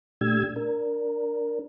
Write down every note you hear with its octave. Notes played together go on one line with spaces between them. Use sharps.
A#2 A3 D4 G4 E6 G#6
D4 A#4